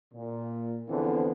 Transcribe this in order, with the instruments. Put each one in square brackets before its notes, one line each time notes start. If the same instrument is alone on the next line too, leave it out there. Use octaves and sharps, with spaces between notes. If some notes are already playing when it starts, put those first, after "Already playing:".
[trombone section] A#2
E2 D3 E3 F3 B3 C4